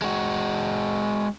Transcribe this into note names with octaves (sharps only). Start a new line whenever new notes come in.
G#3 F#4